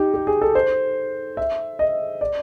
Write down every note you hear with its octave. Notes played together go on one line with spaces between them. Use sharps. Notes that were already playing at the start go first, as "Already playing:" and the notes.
Already playing: D#4 G4
G4
G#4
A4
C5
E5
D#5
D5